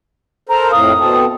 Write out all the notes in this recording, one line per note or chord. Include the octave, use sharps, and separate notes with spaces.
A4 A#4 C5 A#5
F2 A2 F5 D#6
B2 C4 A4